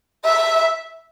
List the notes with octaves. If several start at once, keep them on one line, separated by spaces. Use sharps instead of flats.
E5